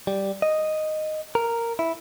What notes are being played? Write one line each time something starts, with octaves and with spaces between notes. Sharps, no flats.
G3
D#5
A#4
E4